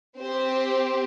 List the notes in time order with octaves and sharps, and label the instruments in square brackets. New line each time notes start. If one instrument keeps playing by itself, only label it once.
[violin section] C4 G4 C5